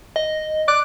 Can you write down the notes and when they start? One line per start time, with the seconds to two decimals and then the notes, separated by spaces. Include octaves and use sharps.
0.16 D#5
0.68 D6 F#6